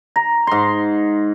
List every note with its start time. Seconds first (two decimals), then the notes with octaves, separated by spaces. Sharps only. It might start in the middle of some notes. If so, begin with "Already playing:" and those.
0.16 A#5
0.47 G#2 C6